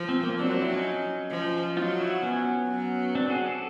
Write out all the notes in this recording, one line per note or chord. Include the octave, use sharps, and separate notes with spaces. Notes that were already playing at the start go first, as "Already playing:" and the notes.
Already playing: F3
C4
A#3
F#3 C4 D4
C4 D4
D4 E4
C#4 D#4
F3
F#3 D#4 F4
E4 F#4
B3 C#4
F#3
C4 D4
F#4 G#4
G4 A4